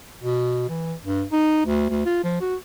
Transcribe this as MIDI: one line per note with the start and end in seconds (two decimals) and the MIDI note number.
0.23 0.67 47
0.69 0.94 52
1.03 1.24 43
1.32 1.61 63
1.66 1.89 38
1.90 2.03 38
2.05 2.21 65
2.24 2.40 53
2.41 2.56 66